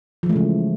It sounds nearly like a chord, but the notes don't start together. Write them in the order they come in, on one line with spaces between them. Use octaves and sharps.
F3 E3 A3 G#3 C#3